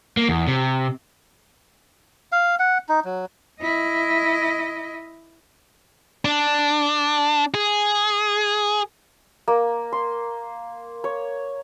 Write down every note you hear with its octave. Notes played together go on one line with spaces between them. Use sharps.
A#3
E2
C3
F5
F#5
D#4
F#3
E4 D#5
D4
G#4
A#3
C6
C#5